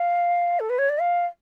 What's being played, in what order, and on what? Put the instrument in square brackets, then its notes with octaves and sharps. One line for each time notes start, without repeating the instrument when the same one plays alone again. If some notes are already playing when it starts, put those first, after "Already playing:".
Already playing: [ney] F5
A4
B4
C#5
D5
F5